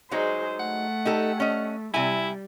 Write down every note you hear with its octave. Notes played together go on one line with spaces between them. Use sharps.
F#3 G#3 D#4 G#4 C5
A3 F#5
D#4 G4 A4
C#4 D#5
C3 G3 E4 G#5